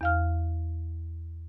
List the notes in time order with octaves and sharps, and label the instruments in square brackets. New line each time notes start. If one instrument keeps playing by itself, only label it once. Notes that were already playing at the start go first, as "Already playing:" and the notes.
[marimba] E2 F5 F6